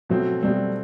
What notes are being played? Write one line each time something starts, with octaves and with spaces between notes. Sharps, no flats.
B2 F#3 A3 C4
B2 G3 A3 C4